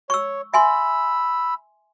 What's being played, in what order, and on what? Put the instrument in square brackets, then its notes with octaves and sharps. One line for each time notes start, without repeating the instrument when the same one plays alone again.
[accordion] C#5 [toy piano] C#6 E6
[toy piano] E5 G#5 C6 [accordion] B5 E6